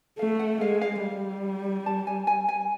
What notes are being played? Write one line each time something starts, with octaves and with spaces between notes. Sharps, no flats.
A3 F5
F#5
G#3 F5
F5
G3
A5
G#5
G#5
G#5